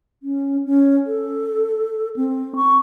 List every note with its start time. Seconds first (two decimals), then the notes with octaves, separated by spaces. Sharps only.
0.23 C#4
0.66 C#4
1.06 A4
2.16 C4
2.56 C#6